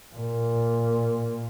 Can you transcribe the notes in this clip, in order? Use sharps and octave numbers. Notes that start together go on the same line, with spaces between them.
A#2